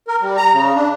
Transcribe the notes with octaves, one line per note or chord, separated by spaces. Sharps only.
A#4
G3
A#5
C#3
D4